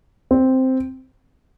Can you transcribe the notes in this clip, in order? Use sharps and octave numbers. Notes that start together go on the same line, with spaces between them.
C4